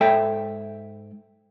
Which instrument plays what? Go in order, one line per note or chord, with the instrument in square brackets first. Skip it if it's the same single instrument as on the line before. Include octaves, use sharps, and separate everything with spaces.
[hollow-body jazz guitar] G#2 A4 E5 G5